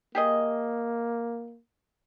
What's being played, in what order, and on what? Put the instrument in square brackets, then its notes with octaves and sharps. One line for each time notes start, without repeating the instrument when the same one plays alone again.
[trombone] A#3 [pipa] G4 G#4 D#5